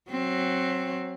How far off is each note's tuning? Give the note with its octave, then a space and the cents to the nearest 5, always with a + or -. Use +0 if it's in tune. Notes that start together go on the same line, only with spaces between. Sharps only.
F#3 +0 C4 +15